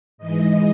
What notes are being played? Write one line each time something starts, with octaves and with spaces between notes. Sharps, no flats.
G#2 E3 G#3 D#5